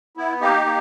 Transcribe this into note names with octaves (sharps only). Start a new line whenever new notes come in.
B3 E4
A#3 D#4 G4
A#3